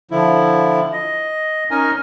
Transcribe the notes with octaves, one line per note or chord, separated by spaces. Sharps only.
D3 F3 E4
D#5
C#4 D#4 A#4 D#5 G#5